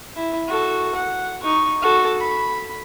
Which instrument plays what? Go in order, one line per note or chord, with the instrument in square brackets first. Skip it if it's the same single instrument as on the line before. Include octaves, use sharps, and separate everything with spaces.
[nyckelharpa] E4
F#4 A4
F#5
D#4 C#6
F#4 A4
B5